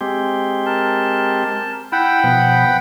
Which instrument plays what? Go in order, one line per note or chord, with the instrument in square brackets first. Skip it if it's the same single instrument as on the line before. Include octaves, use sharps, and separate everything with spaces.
[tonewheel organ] G#3 C4 G4
[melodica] A#4 A5
[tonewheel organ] E4 [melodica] F#5 G5 B5
[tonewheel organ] B2 F3 B3